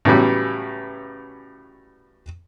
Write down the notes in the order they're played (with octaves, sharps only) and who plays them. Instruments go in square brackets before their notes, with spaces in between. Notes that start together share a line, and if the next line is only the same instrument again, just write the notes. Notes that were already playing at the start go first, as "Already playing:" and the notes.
[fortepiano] A2 C#3 E3 F#3 G3 B3